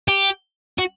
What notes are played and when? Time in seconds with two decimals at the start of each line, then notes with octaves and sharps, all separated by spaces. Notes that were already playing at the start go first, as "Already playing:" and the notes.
0.08 G4
0.78 F#4